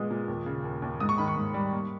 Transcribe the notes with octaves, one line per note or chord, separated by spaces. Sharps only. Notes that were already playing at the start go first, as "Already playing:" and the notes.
Already playing: A#2 G#3 B3 D#6
A#2
D#2
C#3
D#2
D#2
G#2 D#6
C#6
D#3 B5
C#6
G#2
G3
A#3